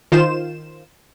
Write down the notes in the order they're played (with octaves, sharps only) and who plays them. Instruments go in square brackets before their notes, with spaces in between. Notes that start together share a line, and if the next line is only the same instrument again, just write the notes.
[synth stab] D#3 F4 C5 E7